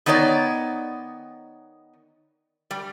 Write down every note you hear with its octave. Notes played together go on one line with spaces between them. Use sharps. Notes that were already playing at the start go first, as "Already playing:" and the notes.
D#3 B3 D#4 C#5 D5
G3